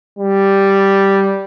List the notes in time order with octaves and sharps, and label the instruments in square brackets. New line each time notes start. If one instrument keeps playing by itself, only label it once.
[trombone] G3